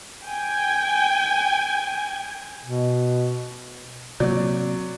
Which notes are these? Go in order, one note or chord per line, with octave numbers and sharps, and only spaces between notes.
G5 G#5
B2
C3 F#3 A#3 D5